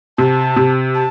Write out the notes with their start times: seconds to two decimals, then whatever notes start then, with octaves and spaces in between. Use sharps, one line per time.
0.18 C3 A5
0.56 C3
0.95 A5